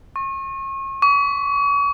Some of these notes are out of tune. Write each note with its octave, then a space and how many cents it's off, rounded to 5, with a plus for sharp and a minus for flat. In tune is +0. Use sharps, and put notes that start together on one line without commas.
C#6 -35
C#6 +40